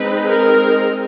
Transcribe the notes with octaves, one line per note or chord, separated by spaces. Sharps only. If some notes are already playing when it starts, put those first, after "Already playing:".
Already playing: G#3 C4 D#4 B4
A#4